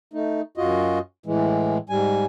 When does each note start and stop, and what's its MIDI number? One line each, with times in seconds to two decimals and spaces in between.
0.13 0.41 57
0.13 0.41 63
0.57 0.99 42
0.57 0.99 65
0.57 0.99 66
0.57 0.99 75
1.26 1.78 45
1.26 1.78 52
1.26 1.78 56
1.89 2.25 44
1.89 2.25 55
1.89 2.25 80